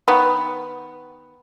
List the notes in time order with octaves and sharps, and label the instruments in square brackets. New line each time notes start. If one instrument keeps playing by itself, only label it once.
[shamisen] D#3 B3